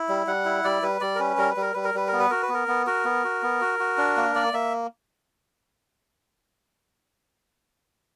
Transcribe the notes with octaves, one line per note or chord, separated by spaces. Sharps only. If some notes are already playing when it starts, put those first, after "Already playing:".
Already playing: E4
G3
G3 F#5
E4
G3 D5
G3 B4
G3 D5
A#4
C#4 B4
G3 A#4
B4
G3 A#4
G3 B4
A#4
G3 B4
A#4
B3
B4
F#4 A#4
B4
B3 A#4
B3
F#4 A#4
B3
F#4
B3
F#4
F#4
D4
A#3
A#3 D5
A#3 E5